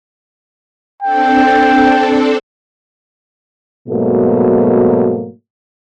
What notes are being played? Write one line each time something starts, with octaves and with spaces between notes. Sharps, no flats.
C4 D4 A4 G5
G#2 B2 F#3 A3 A#3